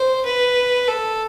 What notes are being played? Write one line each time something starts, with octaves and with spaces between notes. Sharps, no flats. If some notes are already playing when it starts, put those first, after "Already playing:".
Already playing: C5
B4
A4